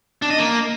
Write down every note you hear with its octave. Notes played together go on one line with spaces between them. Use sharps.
D4
D#5
A#3